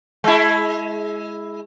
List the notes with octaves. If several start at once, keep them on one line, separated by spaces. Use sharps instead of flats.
G#3 E4